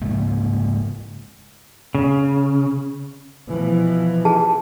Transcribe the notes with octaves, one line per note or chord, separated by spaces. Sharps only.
G#2 C#3 G#3 A#3
C#3
B2 E3 F3
G#4 A5